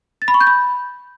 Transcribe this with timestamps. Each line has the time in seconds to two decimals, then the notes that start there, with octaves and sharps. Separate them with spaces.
0.22 A6
0.28 B5
0.34 C#6
0.41 G6
0.47 B5